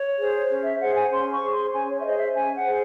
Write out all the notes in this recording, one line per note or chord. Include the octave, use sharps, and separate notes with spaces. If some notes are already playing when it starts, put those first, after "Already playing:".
Already playing: C#5
G#4 C5
C#4
E5
G#4 C5 F#5
G#5
C#4 C6
C#6
G#4 C5
C6
C#4 G#5
C#5
E5
G#4 C5 D#5
E5
C#4 G#5
F#5
G#4 C5